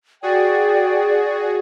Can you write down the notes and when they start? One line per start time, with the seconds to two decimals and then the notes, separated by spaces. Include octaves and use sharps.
0.23 F#4 G#4 D5 G5